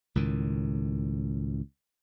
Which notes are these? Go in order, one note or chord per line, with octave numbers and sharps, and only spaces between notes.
C#2 A2 D#3